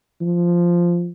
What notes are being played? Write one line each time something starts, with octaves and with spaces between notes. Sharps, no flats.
F3